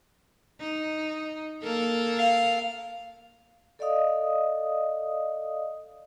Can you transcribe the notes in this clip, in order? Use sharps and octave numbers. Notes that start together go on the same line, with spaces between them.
D#4
A#3 A4 A#4
F5
A4 D5 D#5 F5 D#6